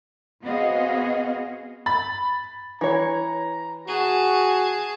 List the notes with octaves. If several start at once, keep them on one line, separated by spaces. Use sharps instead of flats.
B3 C4 F#4 G#4 D#5 F5
B5 A6
E3 C#5 A#5
F#4 G#4 A5